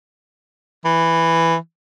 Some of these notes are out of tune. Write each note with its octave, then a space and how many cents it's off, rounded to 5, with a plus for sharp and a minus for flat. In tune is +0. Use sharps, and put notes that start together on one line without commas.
E3 +5